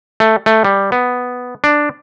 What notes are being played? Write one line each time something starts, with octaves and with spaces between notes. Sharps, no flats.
A3
A3
G3
B3
D4